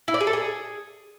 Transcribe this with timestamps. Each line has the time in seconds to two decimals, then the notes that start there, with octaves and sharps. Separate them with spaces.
0.08 E4
0.14 D5
0.21 G#4
0.27 A4
0.33 G#4